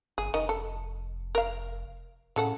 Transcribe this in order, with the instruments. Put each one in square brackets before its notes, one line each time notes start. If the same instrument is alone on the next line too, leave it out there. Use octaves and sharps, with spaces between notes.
[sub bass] G1 [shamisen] G#4
[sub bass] F1 [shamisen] D#3 D#5
[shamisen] A4
A#4 F5
[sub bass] A2 [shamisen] C#3 A4 F#5